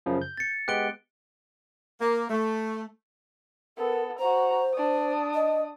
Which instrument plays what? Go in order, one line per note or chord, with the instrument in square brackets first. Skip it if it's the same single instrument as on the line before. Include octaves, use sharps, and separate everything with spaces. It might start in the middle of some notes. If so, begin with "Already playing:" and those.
[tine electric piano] F#2 C#3 F3
G6
[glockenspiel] A6 C#7
[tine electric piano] G#3 B3 G4 [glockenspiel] F#6 D7 G7
[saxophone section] A#3
A3
[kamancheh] B3 A4 [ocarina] A#4
[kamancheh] F#4 A#5 [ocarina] C5
[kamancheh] D4 D#6
[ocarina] D#5